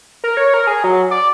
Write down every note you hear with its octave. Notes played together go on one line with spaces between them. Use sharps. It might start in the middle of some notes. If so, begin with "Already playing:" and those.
A#4
C#5
A#4
G#4
F#3
D5